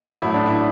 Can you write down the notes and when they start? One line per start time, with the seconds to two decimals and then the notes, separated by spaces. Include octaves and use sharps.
0.22 A1 A2 F#3 A3 E4
0.34 D4
0.46 E4